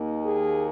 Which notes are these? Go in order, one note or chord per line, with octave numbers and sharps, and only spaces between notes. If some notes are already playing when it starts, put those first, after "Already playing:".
Already playing: D#2 D#3 A#3
G#4